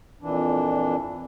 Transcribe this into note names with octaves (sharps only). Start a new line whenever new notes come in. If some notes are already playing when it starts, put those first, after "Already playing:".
F2 A#2 E3 D4